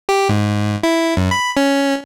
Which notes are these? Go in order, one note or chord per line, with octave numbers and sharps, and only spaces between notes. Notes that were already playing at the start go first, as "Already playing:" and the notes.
G4
G#2
E4
F#2
B5
C#4